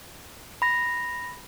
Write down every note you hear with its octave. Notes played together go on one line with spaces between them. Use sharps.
B5 A#6